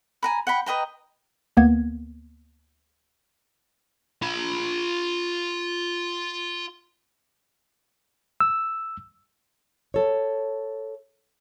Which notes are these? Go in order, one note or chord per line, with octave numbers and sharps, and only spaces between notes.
G#5 A#5 B5
F#5 G5 B5
B4 D#5 G5 A#5
D2 A#3 B3 G#6
F4 B5
E6
A4 C#5